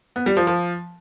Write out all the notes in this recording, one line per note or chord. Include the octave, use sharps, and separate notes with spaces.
B3
G3
F3
F3